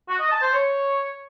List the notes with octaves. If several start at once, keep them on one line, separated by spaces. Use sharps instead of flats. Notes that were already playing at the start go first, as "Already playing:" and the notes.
F#4
D#5
A5
C5
C#5